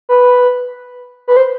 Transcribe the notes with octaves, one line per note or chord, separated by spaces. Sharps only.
B4
B4
C5